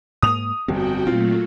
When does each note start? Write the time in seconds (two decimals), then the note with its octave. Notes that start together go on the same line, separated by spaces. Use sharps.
0.22 G#2 A#3 D#6 F7
0.68 G1 F2 C4 F#4 G4 G5
1.07 A#2 F#3 A3 C4 F4